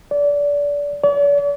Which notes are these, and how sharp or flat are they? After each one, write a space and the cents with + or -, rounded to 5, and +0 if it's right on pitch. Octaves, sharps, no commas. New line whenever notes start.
D5 -25
D5 -45